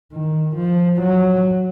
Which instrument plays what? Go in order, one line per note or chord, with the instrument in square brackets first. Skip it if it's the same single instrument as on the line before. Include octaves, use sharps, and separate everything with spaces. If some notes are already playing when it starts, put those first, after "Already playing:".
[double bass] D#3
F3
F#3